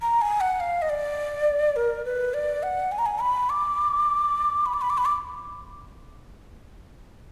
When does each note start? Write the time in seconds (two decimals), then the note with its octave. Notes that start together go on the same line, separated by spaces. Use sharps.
0.02 A#5
0.22 G#5
0.41 F#5
0.60 F5
0.82 D#5
0.89 D5
1.76 A#4
2.05 B4
2.34 D5
2.63 F#5
2.92 G#5
2.99 A#5
3.06 G#5
3.21 B5
3.50 D6
4.66 B5
4.74 D6
4.81 B5
4.90 D6
4.98 B5
5.05 D6